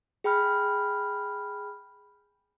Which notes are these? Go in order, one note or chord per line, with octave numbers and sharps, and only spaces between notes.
G#4 G5 B5 F6